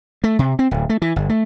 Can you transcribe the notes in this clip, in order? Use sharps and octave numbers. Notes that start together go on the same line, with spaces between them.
A3
C3
C4
D1
A3
E3
G1
A3